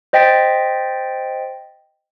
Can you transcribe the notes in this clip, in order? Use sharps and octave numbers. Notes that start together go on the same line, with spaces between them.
C5 D#5 G5 A6 B6 D7